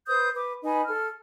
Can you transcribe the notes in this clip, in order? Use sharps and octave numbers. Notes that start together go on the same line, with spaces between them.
B4 C5 D#6 G6
B4 D6
D#4 B4 G#5
A4 F6